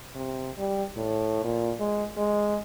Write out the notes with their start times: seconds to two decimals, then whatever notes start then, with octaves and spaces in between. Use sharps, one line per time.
0.15 C3
0.58 G3
0.96 A2
1.44 A#2
1.80 G#3
2.17 G#3